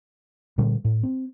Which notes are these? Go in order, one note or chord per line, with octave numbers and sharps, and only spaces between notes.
A#2 D3 G3
A2
C4